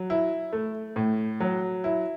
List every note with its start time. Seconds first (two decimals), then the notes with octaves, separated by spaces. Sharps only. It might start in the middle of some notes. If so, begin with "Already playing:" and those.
Already playing: F#3
0.10 E4
0.53 A3
0.96 A2
1.40 F#3
1.84 E4